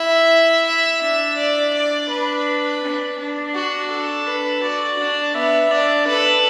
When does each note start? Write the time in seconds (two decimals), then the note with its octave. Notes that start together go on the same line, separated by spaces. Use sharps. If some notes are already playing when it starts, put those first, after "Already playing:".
Already playing: E4 E5
0.66 E5
1.02 D4 E5
1.37 D5
1.73 D5
2.10 D4 B4
2.82 D4
3.18 D4
3.55 F#4
3.91 A4
4.27 B4
4.63 F#4 D5
4.99 D4
5.34 B3 E5
5.71 D4 D5
6.07 A4 B4